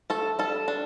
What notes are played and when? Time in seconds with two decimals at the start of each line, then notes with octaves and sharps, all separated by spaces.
0.10 A3 A4
0.39 G3 A4
0.68 D4